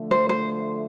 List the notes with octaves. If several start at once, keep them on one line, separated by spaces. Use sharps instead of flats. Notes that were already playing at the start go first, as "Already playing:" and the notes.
Already playing: D3 F3 A3
C5
C5